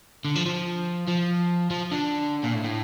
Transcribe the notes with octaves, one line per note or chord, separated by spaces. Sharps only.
D3
F3
F3
F3
F3
D3
A#2
A2
A2